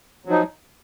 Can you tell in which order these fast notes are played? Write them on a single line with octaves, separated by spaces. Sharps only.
F#3 F3 D#4